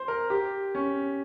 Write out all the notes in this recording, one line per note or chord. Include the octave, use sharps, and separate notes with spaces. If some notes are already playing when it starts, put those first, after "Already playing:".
Already playing: C5
A#4
G4
C#4